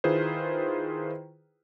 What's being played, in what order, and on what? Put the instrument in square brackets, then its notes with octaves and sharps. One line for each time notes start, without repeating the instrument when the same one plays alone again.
[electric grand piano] D#3 E4 F4 G#4 B4 C5